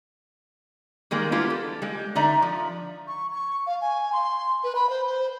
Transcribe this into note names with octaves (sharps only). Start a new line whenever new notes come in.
D#3 G3 G#3 A#3
B3 D4 E4 F4 G4 A#4
A4
G3 G#3
D3 D#4 D5 E5 A#5
F3
C#6
C#6
F5
G#5
C6
B4
B5
C5
C5